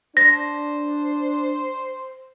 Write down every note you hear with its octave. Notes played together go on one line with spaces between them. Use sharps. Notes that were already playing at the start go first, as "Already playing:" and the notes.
D4 C5 A#6